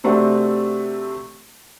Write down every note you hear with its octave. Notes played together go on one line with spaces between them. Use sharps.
C3 A3 C4 D4 F#4